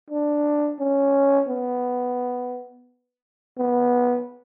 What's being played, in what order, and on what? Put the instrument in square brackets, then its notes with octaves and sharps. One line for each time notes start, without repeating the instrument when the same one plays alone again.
[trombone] D4
C#4
B3
B3